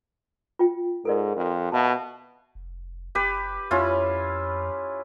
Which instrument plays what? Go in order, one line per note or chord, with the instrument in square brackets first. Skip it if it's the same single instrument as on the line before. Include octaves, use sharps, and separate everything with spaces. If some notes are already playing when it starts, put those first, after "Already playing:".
[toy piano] F4 G5
[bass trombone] G#2 [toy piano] A4 A#4 D5
[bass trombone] F2
[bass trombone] B2 [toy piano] E5 F5 A5
[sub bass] F1
[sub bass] F#1 [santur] G4 B4
[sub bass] F2 [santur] C#4 E4 F4